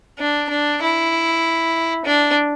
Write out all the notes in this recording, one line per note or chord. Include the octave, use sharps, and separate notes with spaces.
D4
D4
E4
D4